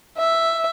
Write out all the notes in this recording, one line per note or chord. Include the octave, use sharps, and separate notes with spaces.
E5